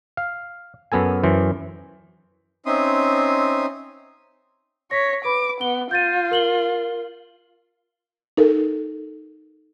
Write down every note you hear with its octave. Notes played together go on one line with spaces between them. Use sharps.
F5
F#2 B3 A4 G#5
F#2 E3 C5
C4 C#4 D#4 E5 C6 D#6
C#5 A#6 B6
B4 B5 D6
B3 G7
F4 G6 A6 D#7
A#4 F#7 G7
D#4 A4 A#4